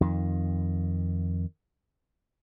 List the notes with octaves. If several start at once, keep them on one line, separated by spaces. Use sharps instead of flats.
F2 D#3